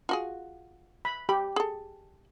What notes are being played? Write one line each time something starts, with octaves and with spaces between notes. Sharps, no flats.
F4 F#4 G#4
B5
G4 B5
G#4 A4